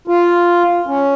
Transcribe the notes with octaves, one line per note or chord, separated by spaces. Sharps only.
F4
C#4